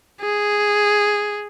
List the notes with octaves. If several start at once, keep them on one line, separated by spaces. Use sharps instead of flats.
G#4